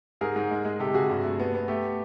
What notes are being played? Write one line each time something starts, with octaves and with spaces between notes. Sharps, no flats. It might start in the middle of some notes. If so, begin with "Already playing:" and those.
G#2 G#4 A#4
G#2
G#3
G#3
C3 G4 A4
C3 F#4 G#4
G2
A3
B3
B3
A3 G4